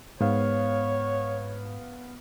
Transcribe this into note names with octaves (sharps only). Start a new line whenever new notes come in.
G#2 B3 C#5 F5